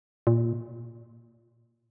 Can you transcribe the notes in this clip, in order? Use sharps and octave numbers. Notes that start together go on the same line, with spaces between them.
A#2